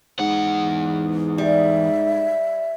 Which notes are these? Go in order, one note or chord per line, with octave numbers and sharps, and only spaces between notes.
E2 G#2 F#5
G3 E5